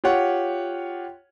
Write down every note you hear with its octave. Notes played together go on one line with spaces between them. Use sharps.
F4 G4 C#5 F#5